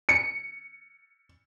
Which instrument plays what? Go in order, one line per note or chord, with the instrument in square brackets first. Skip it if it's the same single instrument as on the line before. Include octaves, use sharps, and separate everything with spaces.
[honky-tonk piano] C#7